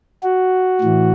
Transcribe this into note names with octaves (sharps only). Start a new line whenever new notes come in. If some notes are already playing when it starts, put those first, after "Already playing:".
F#4
A2 E3